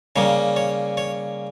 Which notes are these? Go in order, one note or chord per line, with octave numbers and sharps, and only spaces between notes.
C#3 G3 A#3 C#5
C#5
C#5